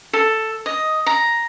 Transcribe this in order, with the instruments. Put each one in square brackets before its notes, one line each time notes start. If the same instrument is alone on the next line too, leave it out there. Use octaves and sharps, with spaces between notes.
[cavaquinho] A4
D#5
A#5